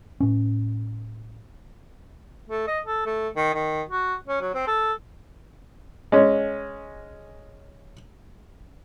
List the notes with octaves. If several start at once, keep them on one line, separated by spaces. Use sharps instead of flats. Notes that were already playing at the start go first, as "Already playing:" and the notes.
A2 C#4
A3
D#5
A4
A3
D#3
D#3
F#4
C#4
F#3
C4
A4
G#3 C#4